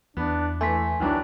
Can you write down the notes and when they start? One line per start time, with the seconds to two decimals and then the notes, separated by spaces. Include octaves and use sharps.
0.17 E2 B3 D4
0.61 E3 A3 G#5 C6 B6
1.00 C2 D#3 E3 F#3 D4